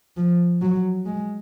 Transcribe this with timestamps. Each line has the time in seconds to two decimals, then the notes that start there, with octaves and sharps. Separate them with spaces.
0.17 F3
0.62 F#3
1.06 G#3